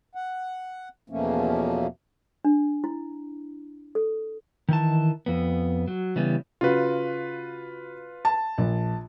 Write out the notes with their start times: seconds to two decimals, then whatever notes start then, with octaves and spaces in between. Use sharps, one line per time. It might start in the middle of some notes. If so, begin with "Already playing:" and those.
0.15 F#5
1.10 E2 B2 F3 A3 A#3 C#4
2.45 D4
2.84 E4
3.95 A4
4.69 D#3 E3 A5
5.26 F2 B3
5.88 F#3
6.16 C#3 E3 G3 B3
6.61 C#3 F4 F#4 B4
8.25 A5
8.58 A#1